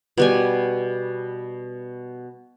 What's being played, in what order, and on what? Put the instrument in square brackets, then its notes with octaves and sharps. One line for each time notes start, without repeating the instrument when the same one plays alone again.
[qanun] B2 G3 G#5